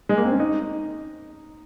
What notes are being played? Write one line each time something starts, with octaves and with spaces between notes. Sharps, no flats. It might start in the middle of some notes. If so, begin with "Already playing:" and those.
G#3
A#3
C4
C#4
D#4